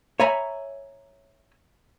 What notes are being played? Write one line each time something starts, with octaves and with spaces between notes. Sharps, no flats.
C#5 E5 G#5 A#5 B5